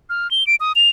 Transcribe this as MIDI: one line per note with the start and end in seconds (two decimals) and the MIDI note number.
0.10 0.30 89
0.31 0.46 103
0.47 0.56 98
0.60 0.72 87
0.76 0.89 101